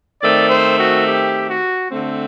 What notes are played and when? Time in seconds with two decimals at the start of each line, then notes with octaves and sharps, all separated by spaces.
0.21 D#3 A3 C4 D5
0.50 C5
0.79 F#4
1.07 G4
1.49 F#4
1.91 D3 A3 C4